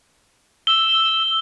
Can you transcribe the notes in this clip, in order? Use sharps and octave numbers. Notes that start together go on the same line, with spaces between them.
E6 G7